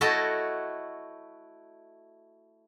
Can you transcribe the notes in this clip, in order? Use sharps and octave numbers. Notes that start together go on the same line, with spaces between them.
A3 E4 F#4 C#5 D#5 A5